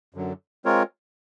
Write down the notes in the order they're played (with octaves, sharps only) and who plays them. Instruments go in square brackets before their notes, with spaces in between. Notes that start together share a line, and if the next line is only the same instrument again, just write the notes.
[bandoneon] F#2 D3 F#3
G#3 C4 F4 A#4 C#5